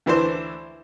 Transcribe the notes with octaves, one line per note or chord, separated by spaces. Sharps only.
D2 E3 D4 C5